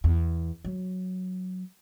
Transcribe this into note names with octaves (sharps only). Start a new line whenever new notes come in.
E2
F#3